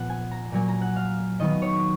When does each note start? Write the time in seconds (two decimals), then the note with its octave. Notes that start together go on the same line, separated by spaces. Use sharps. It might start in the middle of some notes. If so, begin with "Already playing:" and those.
Already playing: A#2 F3 B3 F#5
0.10 G#5
0.31 A#5
0.52 A#2 F#3 A#3 G#5
0.68 A#5
0.81 F#5
0.96 F5
1.40 D#3 F#3 B3 D#5
1.62 C#5